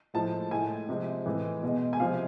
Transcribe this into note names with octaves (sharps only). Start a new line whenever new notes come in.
A2 F3 G#3 A5
A2 G#3 G#5
C3 F3 G#3
A2 E3 G#3
B2 G#3
G#5
C3 F3 G#3 F5